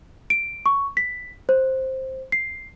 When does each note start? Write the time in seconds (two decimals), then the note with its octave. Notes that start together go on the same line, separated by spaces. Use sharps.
0.30 D7
0.66 C#6
0.97 B6
1.49 C5
2.32 C7